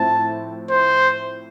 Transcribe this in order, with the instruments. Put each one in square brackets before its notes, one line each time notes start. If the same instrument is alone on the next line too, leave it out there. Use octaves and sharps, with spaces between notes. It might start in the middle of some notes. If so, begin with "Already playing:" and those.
Already playing: [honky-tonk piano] A2 F3 C4 E4 [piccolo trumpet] A5
[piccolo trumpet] C5